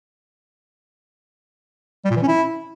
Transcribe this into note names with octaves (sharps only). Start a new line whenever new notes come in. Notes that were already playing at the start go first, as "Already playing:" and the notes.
G3
A#2
E3
C#4
E4